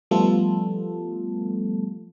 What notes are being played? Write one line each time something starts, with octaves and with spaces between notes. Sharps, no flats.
F3 G3 A3 B3 F4 A4